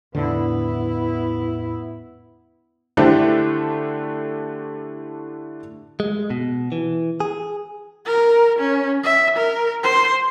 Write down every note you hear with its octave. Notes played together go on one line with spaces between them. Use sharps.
E2 A2 D3 B3 E4
D3 A3 D4 E4 G4 C5
G#3
B2
E3
G#4
A#4
C#4
E5
A#4
C5